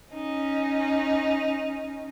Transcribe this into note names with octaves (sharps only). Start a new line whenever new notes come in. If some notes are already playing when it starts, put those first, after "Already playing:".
C#4 D#4